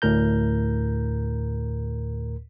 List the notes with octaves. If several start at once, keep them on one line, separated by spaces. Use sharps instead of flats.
D2 A2 A#4 A#5 G6